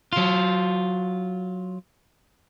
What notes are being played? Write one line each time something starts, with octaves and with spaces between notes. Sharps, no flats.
F#3 F4